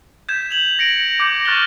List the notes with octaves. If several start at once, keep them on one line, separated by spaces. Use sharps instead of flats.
G6 G#6 B6 E7
F7 F#7
A#6 C#7 D7 F#7
D6 G6 A#6 C#7
C#6 F6 F#6 A6 A#6 G7